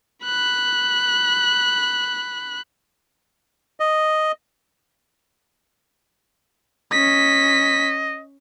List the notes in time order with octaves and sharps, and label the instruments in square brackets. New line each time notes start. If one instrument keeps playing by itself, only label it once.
[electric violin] B5 F#6
[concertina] D#5
[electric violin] C#4 B6 [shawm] D#5